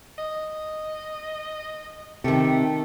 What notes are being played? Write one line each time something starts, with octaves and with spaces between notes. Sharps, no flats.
D#5
C3 D#3 A3 G4